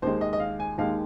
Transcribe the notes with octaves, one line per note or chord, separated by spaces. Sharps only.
D#2 D#3 G#3 C5
D#5
D#5
F5
G#5
D#2 D#3 G#3 F5